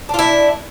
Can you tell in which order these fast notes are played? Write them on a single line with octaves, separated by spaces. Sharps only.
D4 F4 E4